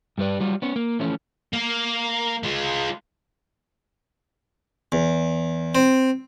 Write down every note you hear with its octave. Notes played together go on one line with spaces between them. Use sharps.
G2 G3 C#4 B4 D5
F#3 G3 F4
B3 C#4
A#3
E3 F3 A3 C#4
A#3
G#3 F4
E2
C4